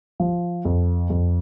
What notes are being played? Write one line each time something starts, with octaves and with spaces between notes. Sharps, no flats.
F3
F2
F2